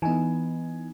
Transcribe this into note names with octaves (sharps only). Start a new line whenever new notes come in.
E3 B3 D#4 G#5